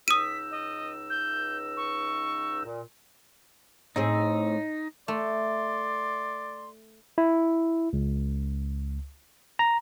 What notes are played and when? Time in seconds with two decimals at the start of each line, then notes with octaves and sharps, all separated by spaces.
0.08 C#2 D#4 D#6 E6 B6 D#7
0.51 D#5
1.10 G6
1.77 C#6
2.65 A#2
3.96 A2 C4 D#4 G#4
5.08 A3 D5 C6
7.18 E4
7.93 C#2
9.59 A#5